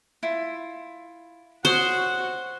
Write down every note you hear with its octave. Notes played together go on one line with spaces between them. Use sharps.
E4 F4
F#4 C5 C#5 D#6